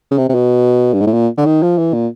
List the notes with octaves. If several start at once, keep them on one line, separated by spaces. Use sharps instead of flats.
C#3
C3
C3
B2
G2
G#2
A2
A#2
D3
D#3
F3
E3
A#2